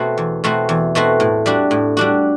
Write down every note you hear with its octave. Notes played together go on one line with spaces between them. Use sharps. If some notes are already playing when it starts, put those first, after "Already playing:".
Already playing: B2 A3 C4 F#4
E2
B2 A3 C4 F#4
E2
B2 A3 C4 F#4
A2
G3 D4 F#4
A2
G3 D4 F#4